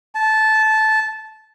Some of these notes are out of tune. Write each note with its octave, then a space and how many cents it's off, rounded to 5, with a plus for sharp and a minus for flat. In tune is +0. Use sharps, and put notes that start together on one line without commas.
A5 -15